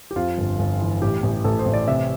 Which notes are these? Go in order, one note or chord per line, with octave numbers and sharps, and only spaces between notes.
G4
F2 F4
G1
G1
E3
A1 G4
A1
A1 A4
C5
A1
D5
C3 E5